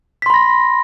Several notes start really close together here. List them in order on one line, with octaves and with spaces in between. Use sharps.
B6 C6 B5 A#6